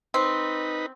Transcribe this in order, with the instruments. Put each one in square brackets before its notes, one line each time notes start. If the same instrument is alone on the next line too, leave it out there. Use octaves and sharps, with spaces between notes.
[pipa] C4 [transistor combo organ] D#4 B4